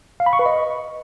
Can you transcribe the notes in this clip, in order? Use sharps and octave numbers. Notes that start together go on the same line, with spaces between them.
F5
B5
C#6
B4
D#5